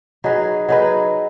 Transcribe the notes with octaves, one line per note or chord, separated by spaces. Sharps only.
F#3 D#4 G#4 B4
F#3 D#4 G#4 B4